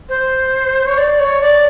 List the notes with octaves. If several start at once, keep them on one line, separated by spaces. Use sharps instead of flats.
C5
C#5
D5
C#5
D5